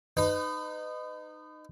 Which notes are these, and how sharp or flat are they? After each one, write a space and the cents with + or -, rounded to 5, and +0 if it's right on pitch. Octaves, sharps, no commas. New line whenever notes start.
D#4 -20 B4 +35